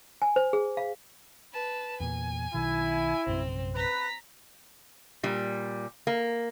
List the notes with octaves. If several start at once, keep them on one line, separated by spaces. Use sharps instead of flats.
G#5
C5
G#4
F5
B4 A5
E2 A#2 G#5
B1 B2 D#3 E4
A#1 F#2 C3 C4
B4 A#5 B6
A#2 G3
A#3